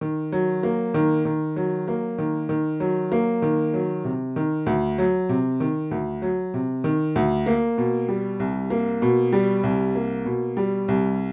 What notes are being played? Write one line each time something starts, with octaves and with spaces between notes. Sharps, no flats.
D#3
F#3
A#3
D#3
D#3
F#3
A#3
D#3
D#3
F#3
A#3
D#3
F#3
C3
D#3
D2
F#3
C3
D#3
D2
F#3
C3
D#3
D2
A#3
B2
G3
C2
A#3
B2
G3
C2
A#3
B2
G3
C2